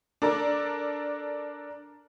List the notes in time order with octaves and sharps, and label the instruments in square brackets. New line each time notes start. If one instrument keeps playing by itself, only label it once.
[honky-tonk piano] D4 A4 A#4 D5